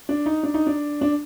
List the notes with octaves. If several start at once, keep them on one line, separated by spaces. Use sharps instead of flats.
D4
D#4
D4
D#4
D4
D4